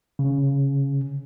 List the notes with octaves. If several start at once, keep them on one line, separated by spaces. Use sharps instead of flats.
C#3